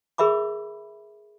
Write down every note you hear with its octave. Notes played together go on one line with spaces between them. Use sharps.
G#4 A#4 E5 B5 D6